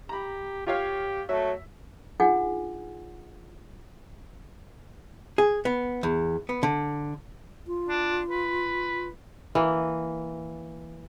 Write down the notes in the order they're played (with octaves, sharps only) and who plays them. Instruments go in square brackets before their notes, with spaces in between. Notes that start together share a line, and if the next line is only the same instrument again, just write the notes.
[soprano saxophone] G4 [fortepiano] A#5 B5
[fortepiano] F4 C#5 F5 [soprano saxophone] G4
[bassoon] F#3 [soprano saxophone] A3 [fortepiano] E5
[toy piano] D4 D#4 F4 G#4 F#5 G#5
[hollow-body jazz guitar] G#4
B3
E2
B3
D3
[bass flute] F4
[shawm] D4
B4
[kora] E3 A#3